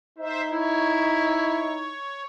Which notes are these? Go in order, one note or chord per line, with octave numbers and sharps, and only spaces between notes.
D#4 C5 E5
E4 C#5